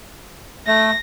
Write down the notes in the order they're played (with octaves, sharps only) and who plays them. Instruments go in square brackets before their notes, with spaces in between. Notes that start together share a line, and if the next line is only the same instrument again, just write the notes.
[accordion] A3 [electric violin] A#6